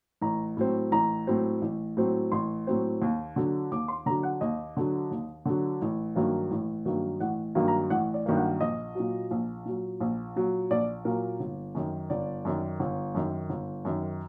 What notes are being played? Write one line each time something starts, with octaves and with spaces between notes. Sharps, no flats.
A1 A#5
A2 F#3 C4
A1 A#5
A2 F#3 C4
A1
A2 F#3 C4
A1 C6
A2 F#3 C4
D#2
D3 F#3
D#2 D6
C6
D3 F#3 A#5
F#5
D#2 D#5
D3 F#3
D#2
D3 F#3
A1
G2 D#3 F#3 A#3
A1
G2 D#3 F#3 A#3
A1 F#5
G2 D#3 F#3 A#3
A#5
A1 F#5
D5
G2 D#3 F#3 A#3
F#5
A#1 D#5
A#2 F#3
A#1
A#2 F#3
A#1
A#2 F#3
A#1 D5
A#2 F#3 A#4
G1
F#2 D#3
G1 D5
F#2 D#3
G1
F#2 D#3
G1
F#2 D#3